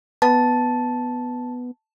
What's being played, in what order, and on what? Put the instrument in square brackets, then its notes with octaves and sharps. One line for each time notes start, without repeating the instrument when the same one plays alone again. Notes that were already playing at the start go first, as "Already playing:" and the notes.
[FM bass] B3 [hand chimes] A5